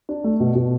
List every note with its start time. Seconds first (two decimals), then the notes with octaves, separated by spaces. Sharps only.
0.09 D4
0.24 A3
0.40 B2
0.55 B2